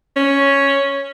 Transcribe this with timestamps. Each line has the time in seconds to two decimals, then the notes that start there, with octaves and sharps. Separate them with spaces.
0.16 C#4